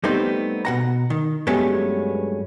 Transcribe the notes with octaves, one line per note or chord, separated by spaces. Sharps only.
G3 A3 B3 C4 D#4 C5
B2 F#5 A#5
D#3
G2 F#3 G#3 A3 B3 C#4